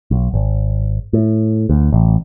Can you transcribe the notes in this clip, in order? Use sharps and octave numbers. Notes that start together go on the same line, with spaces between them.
B1
G#1
A2
D2
A1